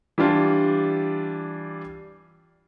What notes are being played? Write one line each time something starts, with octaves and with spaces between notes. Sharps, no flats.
E3 G3 D4 F4 G4